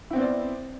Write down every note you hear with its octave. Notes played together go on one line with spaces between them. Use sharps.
B3 C4 E4 C5 D5